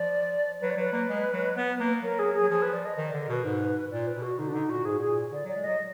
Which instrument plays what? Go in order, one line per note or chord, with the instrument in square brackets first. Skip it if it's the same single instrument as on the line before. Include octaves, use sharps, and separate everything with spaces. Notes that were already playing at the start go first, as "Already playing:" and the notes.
Already playing: [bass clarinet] F3 [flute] D5
[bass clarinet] F#3 [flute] B4
[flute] D5
[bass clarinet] F#3 [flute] B4
[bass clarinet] A#3
G#3
F#3
B3
A#3
[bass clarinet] F#3 [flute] A#4
[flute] G#4
G#4
[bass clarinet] F#3
[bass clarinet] F3 [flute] G#4
[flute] B4
D5
D#5
[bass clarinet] D#3 [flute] D#5
[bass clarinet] D3 [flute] D5
[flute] A#4
[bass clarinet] B2 [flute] B4
[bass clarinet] G#2
[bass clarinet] A#2 [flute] D5
[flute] B4
[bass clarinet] B2
[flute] F#4
[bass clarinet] D3 [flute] D#4
[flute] D4
[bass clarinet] D3 [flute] D#4
[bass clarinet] A#2 [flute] F#4
[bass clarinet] G#2 [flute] G#4
[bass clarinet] A#2 [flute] G#4
[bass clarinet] D3 [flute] D5
[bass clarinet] F#3
[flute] D5
[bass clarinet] G#3
[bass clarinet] F#3 [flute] D#5